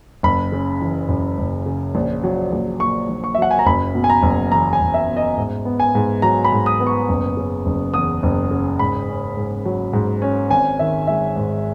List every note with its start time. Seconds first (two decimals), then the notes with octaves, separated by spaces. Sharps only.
0.23 F#1 B5
0.52 C#3
0.81 E3
1.09 F#2
1.38 F#1
1.66 C#3
1.95 A#1
2.24 F#3
2.52 A#1
2.80 A#2 C#6
3.09 A#1
3.24 C#6
3.35 E5
3.38 F#3 F#5
3.51 G#5
3.59 A#5
3.66 F#1 B5
3.95 B2
4.04 G#5
4.10 A#5
4.23 F#1
4.52 E2 A#5
4.73 G#5
4.81 F#1
4.94 E5
5.08 B2
5.17 D#5
5.37 G#2
5.65 B3
5.80 G#5
5.95 G#2
6.22 F#3 A#5
6.44 B5
6.52 G#2
6.66 D#6
6.80 B3
6.87 C#6
7.09 F#1
7.37 C#3
7.66 F#1
7.94 E2 D#6
8.23 F#1
8.51 C#3
8.79 G#2 B5
9.09 C#4
9.37 G#2
9.65 F#3
9.93 G#2
10.22 C#4
10.50 G#1 G#5
10.79 D#3 E5
11.07 G#3 E5
11.36 G#2